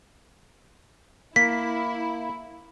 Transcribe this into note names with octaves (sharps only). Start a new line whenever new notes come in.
A#3 E4 B6